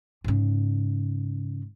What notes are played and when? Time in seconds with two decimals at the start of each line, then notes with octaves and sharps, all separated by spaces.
0.24 G#2 C#3